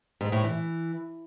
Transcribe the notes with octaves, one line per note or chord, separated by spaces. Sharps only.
G#2
A2
E3